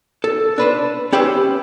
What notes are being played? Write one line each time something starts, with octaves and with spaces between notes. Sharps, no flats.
A4
D4 B4 C5
C#4 G4 B4 C5 E5